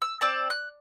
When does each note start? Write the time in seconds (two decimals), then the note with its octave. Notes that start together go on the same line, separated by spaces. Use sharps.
0.02 E6
0.21 C4 D5 A5
0.50 F#6